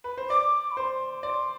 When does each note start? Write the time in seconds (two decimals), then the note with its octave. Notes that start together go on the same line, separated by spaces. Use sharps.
0.04 B4
0.18 C5
0.30 D5 D6
0.71 B5
0.77 C5 C6
1.23 D5 C6